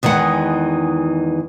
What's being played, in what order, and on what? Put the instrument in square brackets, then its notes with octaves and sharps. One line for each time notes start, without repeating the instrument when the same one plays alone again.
[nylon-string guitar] E2 D#3 E3 G#3 F#5